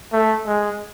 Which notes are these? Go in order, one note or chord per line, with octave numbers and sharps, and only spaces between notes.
A3
G#3